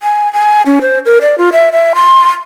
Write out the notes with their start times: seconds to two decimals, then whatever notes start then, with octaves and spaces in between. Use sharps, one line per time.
0.03 G#5
0.33 G#5
0.66 C#4
0.81 C5
1.05 A#4
1.22 D5
1.38 F4
1.53 E5
1.72 E5
1.95 C6